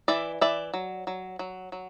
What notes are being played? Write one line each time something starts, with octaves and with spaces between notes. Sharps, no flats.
E3 D5 E5
E3 D5 E5
F#3
F#3
F#3
F#3